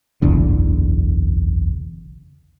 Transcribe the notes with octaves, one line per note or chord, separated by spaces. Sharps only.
F#1 B1 E2 D3